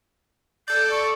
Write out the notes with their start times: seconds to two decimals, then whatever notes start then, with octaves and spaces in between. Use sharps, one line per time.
0.68 A4 D5 G6
0.91 C#6